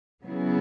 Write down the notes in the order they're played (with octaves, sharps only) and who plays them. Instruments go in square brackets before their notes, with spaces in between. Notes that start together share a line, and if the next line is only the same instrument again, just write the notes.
[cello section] C#3 F#3 B3 E4 G#4